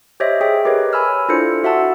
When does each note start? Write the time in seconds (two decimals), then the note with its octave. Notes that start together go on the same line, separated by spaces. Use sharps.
0.20 G4 C5 C#5 D#5 E5
0.41 G#4 C#5 E5 G5
0.65 G4 A#4 B4 C#5 D#5
0.93 G#5 B5 E6 F6
1.29 D4 E4 F4 A4 C5 C#7
1.64 F#4 E5 F#5 A5 E6